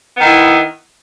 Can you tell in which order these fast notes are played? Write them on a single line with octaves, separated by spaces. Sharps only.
B3 D#3 E4